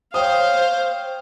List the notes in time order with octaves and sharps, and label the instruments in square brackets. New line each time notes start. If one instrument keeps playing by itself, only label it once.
[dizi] C5 [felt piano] C#5 G5 D#6 [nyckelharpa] F5